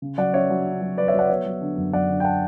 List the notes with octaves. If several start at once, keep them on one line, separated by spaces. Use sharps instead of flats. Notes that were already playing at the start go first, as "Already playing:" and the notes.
C#3
F#3 D5 F#5
C#4 C#5 E5
F#3
C#4
F#3
F#3 B4 D5
C#5 E5
F#3
D5 F#5
B3 C#5 E5
F#3
D3
F#2
F#2 D5 F#5
D3
G5
F#5 A5